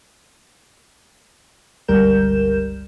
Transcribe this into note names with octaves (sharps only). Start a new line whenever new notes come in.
G1 C#2 G3 A#4 G6 E7